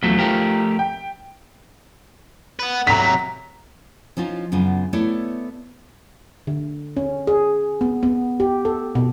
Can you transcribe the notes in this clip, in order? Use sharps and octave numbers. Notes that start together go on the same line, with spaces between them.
E2 F3 F#3 A3 B6
F3 A3 G4 A#4
G5
B3 B4
C3 F#3 A#5 B6
F3 C#4 D#4 F4
F#2 C#3 B3 F4
A3 B3 E4 C#5 D5
D3
C#4
G#4
B3
B3
G4
A4
B2